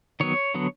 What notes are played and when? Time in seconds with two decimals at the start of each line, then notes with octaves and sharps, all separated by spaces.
0.20 D#3 F#3 B3 C#5
0.54 D3 F#3 B3